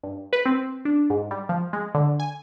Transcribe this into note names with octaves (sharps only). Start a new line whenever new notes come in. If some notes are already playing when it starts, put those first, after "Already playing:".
G2
B4
C4
D4
G#2
G3
F3
G#3
D3
G#5